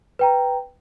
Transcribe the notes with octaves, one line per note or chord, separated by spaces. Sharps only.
B4 G5 A#5